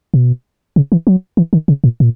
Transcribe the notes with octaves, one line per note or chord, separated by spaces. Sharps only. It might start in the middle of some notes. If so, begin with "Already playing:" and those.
B2
C#3
E3
F#3
E3
D#3
C#3
A#2
A#2